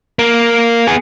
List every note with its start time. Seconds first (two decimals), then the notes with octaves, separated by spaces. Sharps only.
0.19 A#3
0.87 B3 G#4